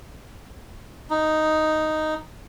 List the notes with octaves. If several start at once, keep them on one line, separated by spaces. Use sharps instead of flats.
D#4